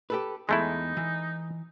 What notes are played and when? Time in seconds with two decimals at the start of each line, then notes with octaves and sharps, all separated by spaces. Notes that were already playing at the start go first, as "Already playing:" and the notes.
0.10 G4 A4 B4
0.49 E2 G#3 A3 D#4 E4
0.97 E3